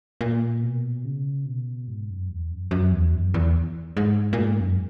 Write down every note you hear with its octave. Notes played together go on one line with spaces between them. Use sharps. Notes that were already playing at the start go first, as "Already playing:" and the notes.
A#2
B2
C#3
B2
G#2
F#2
E2
F#2
F#2
E2
F#2
E2
G#2
A#2
G#2
F#2